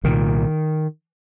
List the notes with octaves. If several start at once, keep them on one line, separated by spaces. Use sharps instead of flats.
C2 A#2 D#3